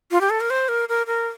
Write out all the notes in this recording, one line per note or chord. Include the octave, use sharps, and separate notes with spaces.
F4
G4
A4
A#4
C5
A#4
A#4
A#4